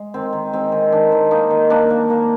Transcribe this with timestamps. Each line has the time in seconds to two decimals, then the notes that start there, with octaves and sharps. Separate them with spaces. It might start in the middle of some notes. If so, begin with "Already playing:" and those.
Already playing: G#3
0.14 D#3 C4
0.33 D#3
0.53 G#3 C4
0.72 D#3
0.92 D#3 D4
1.12 D#3
1.31 A#3 D#4
1.50 D#3
1.70 A#3 D4
1.90 A#3
2.10 A#3